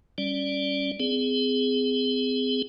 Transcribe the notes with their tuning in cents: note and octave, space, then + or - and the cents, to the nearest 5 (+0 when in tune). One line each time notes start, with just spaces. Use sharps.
G3 +0 C#4 +0 D5 +0
C4 -40 G#4 +0